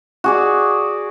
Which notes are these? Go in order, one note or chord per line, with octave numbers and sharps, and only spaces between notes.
F#4 G#4 D5